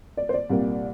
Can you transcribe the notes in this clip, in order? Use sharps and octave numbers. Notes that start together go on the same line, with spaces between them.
D5
C5
D5
C2 A#2 G3 A#3